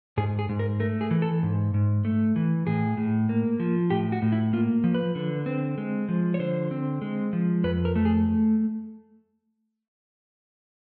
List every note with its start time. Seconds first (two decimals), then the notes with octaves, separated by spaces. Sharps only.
0.17 G#2 G#4
0.39 G#4
0.49 G#2
0.59 A#4
0.80 A3 A#4
1.01 G#4
1.11 E3
1.22 A4
1.43 G#2
1.74 G#2
2.05 A3
2.36 E3
2.67 A2 G#4
2.97 A2
3.29 A#3
3.60 F3
3.90 A2 G4
4.12 F#4
4.22 A2
4.32 E4
4.53 A#3 F4
4.84 F3
4.94 B4
5.15 D3
5.46 C4
5.78 G#3
6.09 F3
6.34 C#5
6.39 D3 C5
6.71 C4
7.02 G#3
7.33 F3
7.64 F2 B4
7.85 A#4
7.96 A3
8.05 G#4